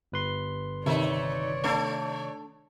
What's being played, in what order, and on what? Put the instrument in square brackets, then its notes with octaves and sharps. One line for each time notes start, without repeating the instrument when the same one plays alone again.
[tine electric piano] G1 B4 C6
[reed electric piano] C3 D#3 [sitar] A3 D#4 E5 [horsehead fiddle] C#5 D5
[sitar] A3 D4 A4